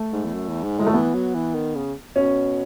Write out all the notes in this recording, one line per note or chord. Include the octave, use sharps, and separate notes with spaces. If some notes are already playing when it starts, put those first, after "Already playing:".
Already playing: A3
G#2
E2
F#2
E2
G#2
A2 G#3
A3
E3 B3
F#3
E3
D#3
C#3
B2 C#4